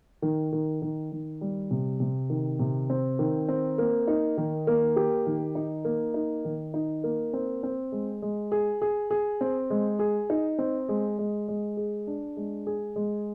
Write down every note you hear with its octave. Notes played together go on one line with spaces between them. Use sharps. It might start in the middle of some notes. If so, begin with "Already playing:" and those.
D#3
D#3
D#3
D#3
G3
C3
C3
D#3
C3
C4
D#3
C4
A#3
D#4
D#3
A#3
G4
D#3
D#4
A#3
D#4
D#3
D#4
A#3
C4
C4
G#3
G#3
G#4
G#4
G#4
C4
G#3
G#4
D#4
C4
G#3
G#3
G#3
G#4
D4
G#3
G#4
G#3